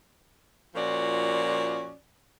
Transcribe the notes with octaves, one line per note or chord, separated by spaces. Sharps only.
A#2 F3 C#4 F#4 D5